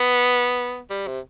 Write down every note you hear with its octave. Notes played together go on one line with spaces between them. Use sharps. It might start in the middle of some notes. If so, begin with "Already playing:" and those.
Already playing: B3
G3
C3